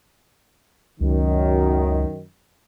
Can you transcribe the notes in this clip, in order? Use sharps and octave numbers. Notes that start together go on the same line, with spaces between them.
C#2 F#2 D#3